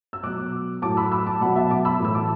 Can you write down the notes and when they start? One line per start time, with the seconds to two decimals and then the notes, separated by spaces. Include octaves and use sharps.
0.13 E6
0.23 B2 F#3 D6 F#6
0.82 A2 F#3 A5 D6
0.97 B5 E6
1.12 B5 E6
1.27 A5 D6
1.41 B2 F#3 F#5 B5
1.56 E5 A5
1.70 A5 D6
1.85 B5 E6
2.00 A2 E3 E6
2.14 A5 D6